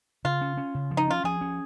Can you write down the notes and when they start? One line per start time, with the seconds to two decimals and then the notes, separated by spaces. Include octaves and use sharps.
0.25 C#3 F4
0.42 C#4
0.57 C#4
0.75 C#3
0.91 F3
0.97 D#4
1.07 C#4 F4
1.24 F3 G#4
1.41 C#4